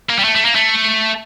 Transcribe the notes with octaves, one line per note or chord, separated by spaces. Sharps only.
A#3
G3
A3
A3
A#3
A3